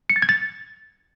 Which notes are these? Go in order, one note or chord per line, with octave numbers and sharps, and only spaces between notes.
C#7
A6
G#6
A6